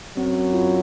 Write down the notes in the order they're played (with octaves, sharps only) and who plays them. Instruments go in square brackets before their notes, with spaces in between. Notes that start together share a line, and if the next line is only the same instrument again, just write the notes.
[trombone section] F#2 F#3 [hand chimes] C4
[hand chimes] C4
F4